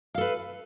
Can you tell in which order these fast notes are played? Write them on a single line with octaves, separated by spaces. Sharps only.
F5 A4 B4